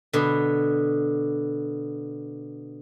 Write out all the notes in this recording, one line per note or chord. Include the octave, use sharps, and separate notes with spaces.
B2 D3